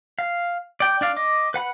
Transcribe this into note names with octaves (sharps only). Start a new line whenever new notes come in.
F5
D5 G5
D4 D5 F5
D#5 D6
B4 F#5 B5